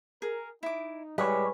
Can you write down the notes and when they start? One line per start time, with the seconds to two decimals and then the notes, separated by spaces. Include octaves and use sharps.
0.22 G#4 A#4
0.63 D#4 E4 D6
1.18 A2 G3 G#3 B4 C#5 F#5 G#5 B5